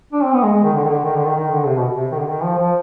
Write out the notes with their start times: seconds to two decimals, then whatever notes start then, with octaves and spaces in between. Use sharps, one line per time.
0.13 D4
0.24 C4
0.33 B3
0.44 G#3
0.54 G#3
0.64 D#3
0.74 D3
0.85 D#3
0.89 D3
1.05 D#3
1.15 D3
1.26 D#3
1.36 D#3
1.52 D3
1.66 C3
1.77 B2
1.97 C3
2.12 D#3
2.18 D3
2.28 D#3
2.44 F3
2.59 F3